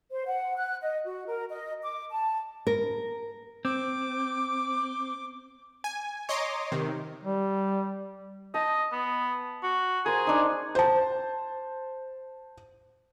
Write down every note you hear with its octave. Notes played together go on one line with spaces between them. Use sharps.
C5
F#5
F#6
D#5
F#4
A#4
D#5
D6
A5
A#4
C4 D6
G#5
C#5 D#5 A#5 C6 D6
C3 D#3
G3
D#5 A5
B3
F#4
G#4 A#4 C5
D4 D#4
C5 A5